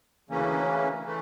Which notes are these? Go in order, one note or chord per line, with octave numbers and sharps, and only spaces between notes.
D2 C#3 E3 A#3 C#4
E3 A3